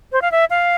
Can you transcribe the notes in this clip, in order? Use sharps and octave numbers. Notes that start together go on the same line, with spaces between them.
C5
F5
E5
F5